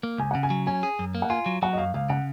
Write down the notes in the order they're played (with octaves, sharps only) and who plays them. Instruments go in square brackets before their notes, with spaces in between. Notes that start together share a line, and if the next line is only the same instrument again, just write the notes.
[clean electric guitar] A#3
[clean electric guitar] C#2 [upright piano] G#5
[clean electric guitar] C#3 [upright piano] F#5
[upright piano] G#5
[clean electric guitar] F#3
[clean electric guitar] C#4 [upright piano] G#5
[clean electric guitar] G#4
F#2
A#3
[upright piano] F#5
[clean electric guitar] F4 [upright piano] G#5
[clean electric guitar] F#3
[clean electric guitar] F#3 [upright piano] F#5
[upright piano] D#5
[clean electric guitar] F#2 [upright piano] F5
[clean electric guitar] C#2 [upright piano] F5
[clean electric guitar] C#3 [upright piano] F#5